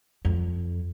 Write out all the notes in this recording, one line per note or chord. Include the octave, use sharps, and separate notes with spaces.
F2